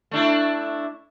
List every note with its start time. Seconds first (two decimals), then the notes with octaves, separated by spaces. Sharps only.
0.11 A3 D4 E4